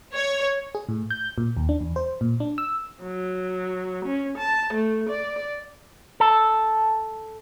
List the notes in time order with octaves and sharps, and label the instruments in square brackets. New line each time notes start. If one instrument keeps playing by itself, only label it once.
[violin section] C#5
[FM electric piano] G#4
A2
G6
A#2
D#2
D4
E2
C5
A#2
D4
E6
[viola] F#3
C#4
A5
A3
D5
[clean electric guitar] A4